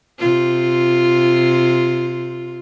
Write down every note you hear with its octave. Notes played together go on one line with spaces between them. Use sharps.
C3 F4